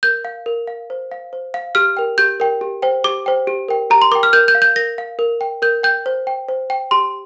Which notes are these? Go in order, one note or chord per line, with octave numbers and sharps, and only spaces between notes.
A#4 G6
F5
A#4
F5
C5
F5
C5
F5
G4 F6
A#4 G5
G4 G6
A#4 G5
G4
C5 G5
G4 D6
C5 G5
G4
A#4 G5
G4 A#5
C6
A#4 G5 D6
F6
A#4 G6
G6
F5
G6
A#4 A#6
F5
A#4
G5
A#4 G6
G5 G6
C5
G5
C5
G5
G4 C6